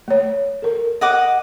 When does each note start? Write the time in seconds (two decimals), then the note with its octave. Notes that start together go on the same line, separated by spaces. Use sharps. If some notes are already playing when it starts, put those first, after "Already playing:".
0.08 A3 C#5
0.62 A4 A#4
1.01 D#5 F#5 D6